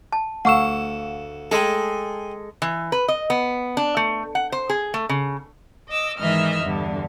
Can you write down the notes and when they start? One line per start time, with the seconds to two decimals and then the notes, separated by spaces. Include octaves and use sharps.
0.12 A5
0.45 D2 A3 F5 F#5 C#6 E6 E7
1.51 G#3 G#4 A4 G5
2.62 E3
2.92 B4
3.08 D#5
3.30 B3
3.77 D4
3.97 A3
4.35 F#5
4.52 C5
4.69 G#4
4.94 A3
5.09 C#3
5.89 D#5 D6 E6
6.19 G#2 D#3 E3 D#5 E5 F6
6.62 E2 G2 D3